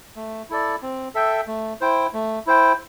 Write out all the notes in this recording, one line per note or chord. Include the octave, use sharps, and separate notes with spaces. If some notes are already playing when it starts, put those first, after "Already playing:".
A3
E4 A4 D5
C4
A4 E5 G5
A3
E4 C5 G5
A3
E4 C5 G5